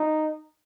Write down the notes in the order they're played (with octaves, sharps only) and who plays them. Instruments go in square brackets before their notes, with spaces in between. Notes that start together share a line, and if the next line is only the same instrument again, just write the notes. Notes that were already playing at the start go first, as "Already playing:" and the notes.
Already playing: [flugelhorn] D#4